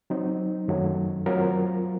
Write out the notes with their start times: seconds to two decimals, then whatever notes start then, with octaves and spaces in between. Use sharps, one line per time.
0.10 F#3 C4 D#4
0.68 F#2 D#3 F#3 A3
1.26 F#3 C4 F4 A#4